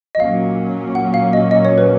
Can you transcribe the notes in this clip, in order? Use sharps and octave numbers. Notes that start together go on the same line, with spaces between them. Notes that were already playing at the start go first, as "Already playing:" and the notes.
D#5
A#2 F#3 A#3 C#4 F5
F#5
F5
D#5
D#5
C#5
B4